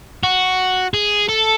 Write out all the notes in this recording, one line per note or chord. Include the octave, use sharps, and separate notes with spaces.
F#4
G#4
A4